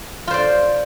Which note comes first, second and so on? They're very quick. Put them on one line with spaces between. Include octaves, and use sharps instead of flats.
F4 C5 D5